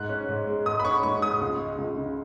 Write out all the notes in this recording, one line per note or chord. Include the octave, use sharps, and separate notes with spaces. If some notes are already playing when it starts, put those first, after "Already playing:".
Already playing: G#2 F#6
C#4
G#2
G#3
G#2 D#6
B5
C#4 C#6
G#2 C#6
G#3 D#6
C#2
G#3
C#2
C#3